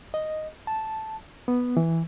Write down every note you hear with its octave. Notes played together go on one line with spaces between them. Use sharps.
D#5
A5
B3
E3